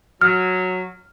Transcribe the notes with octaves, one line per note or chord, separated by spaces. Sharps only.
F#3 F6